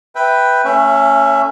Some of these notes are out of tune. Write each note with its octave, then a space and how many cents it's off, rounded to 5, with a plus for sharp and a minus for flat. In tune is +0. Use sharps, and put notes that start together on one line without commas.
B4 +0 E5 -5 G5 +0
A3 +40 C#4 +0 E5 +20